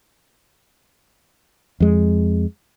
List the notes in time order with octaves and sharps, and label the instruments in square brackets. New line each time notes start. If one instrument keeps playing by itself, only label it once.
[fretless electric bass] F2 G#3